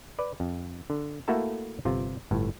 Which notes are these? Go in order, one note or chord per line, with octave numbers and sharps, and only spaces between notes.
B4 D5
F2
D3
A3 A#3 E4 F#4 A4 A5
G1 C3 F4
G1 A2